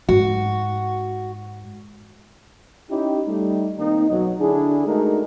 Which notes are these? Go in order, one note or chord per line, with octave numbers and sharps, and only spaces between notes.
G#2 F#4
C#4 D#4 E4 G4
G3 A3 D#4
D#3 A#3 C4 D#4
B1 F#3
D3 D4 E4 G#4
G#3 A3 D#4 F#4 A4 A#4